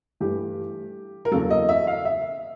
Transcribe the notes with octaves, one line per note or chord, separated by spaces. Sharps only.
G2 E3 A3 G4
A#4
E2 C#3 F#3 A#3 A4
D#5
E5
F5
E5